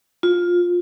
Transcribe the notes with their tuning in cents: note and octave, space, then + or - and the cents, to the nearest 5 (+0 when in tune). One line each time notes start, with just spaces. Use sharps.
F4 +15